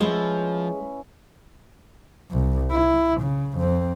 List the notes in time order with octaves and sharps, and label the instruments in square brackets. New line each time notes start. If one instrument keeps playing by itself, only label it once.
[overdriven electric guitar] F3 [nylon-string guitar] G#3 [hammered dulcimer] C#4 E4 B4
[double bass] C2
E4
C#3
F2 C4